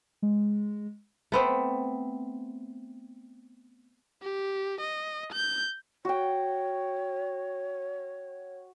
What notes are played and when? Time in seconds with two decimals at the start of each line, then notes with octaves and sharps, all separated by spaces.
0.22 G#3
1.32 A3 B3 C4
4.22 G4
4.81 D#5
5.33 G6
6.05 F#4 C#5 G5